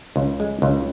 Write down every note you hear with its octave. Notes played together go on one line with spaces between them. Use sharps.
C#2
G#3
C#2